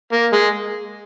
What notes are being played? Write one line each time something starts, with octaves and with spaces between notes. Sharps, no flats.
A#3
G#3